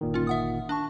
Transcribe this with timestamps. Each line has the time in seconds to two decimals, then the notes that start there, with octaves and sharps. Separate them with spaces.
0.01 G1 A#2 D#3
0.14 C#4 F4
0.27 E5 F#5 D#6
0.69 D4 A5 C#6